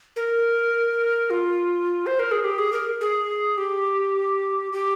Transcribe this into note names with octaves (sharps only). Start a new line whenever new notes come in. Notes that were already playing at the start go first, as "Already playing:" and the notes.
A#4
F4
C5
A#4
G#4
G4
G#4
A#4
G#4
G4
G4